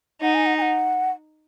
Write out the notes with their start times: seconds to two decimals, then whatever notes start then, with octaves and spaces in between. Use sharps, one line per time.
0.23 D#4 F#5
0.34 G#5
0.46 F#5
0.58 G#5
0.62 F#5